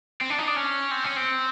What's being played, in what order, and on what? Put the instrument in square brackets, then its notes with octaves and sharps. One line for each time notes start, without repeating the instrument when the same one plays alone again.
[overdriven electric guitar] C4
D4
D#4
D4
C#4
C4
C#4
C4